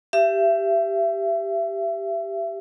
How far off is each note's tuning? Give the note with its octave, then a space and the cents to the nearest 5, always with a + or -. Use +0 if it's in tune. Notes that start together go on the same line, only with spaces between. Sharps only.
G4 +0 E5 +30